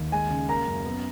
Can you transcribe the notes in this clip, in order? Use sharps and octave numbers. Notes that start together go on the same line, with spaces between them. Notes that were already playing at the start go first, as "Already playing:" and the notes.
Already playing: D#2
G#3 G#5
C#3
A#3 A#5
F#2
B3